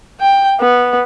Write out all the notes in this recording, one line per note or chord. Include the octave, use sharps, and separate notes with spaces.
G5
B3